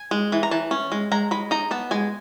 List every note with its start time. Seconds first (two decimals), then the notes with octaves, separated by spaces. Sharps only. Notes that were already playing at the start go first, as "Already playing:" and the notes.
Already playing: G#5
0.11 G#3
0.32 E3
0.43 A#5
0.51 E3 A5
0.71 C#4
0.92 G#3
1.12 G#3 A#5
1.31 G#3 B5
1.51 D#4 A#5
1.71 B3 A5
1.91 G#3 G#5